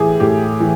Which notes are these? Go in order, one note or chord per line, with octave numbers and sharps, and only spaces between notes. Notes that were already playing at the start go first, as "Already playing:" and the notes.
Already playing: A2 E3 G4 G#4
A2 G4
E3